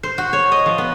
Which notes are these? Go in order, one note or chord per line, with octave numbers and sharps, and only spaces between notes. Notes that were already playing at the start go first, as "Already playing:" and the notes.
C5
F#4
C#5
D#5
F3
B3